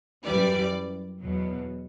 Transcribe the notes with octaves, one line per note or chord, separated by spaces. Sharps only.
F#2 E3 G3 D5
E2 B2 F#3